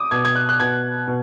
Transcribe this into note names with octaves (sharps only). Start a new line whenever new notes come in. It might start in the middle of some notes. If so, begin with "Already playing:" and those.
Already playing: D6 D#6
B2 G#6
G#6
F#6
F#6
B2 G#6
B2